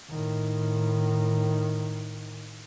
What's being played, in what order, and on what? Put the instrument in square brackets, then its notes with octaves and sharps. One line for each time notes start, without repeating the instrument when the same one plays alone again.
[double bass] A2 D#3